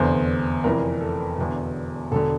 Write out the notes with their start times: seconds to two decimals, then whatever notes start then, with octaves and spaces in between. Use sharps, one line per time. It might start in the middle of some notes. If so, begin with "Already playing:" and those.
Already playing: F1 E2 D3 C5
0.64 F1 F2 E3 A#4
1.01 A4
1.38 E1 E2 D3
2.11 E1 D3 A4